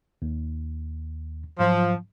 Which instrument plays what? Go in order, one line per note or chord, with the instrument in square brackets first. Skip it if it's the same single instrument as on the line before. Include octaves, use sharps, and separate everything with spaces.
[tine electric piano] D#2
[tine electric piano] G#2 F#3 [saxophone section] F3